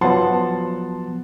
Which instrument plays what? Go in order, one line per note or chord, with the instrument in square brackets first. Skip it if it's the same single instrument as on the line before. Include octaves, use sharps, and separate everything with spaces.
[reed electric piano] F3 F#3 B3 [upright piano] F#5 A5 C6